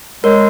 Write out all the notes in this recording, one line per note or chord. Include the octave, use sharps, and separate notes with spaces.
G#3 A#4 C#5